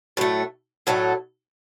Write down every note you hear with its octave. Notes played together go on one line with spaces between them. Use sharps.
A2 F#3 A3
A2 F#3 A3